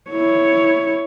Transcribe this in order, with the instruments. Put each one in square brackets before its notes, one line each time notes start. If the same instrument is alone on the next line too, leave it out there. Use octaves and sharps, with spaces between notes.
[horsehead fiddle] E4 C#5